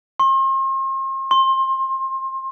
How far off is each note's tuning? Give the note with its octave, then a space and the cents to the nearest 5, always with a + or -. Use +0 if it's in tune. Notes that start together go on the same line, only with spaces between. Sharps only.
C6 +40
C6 +25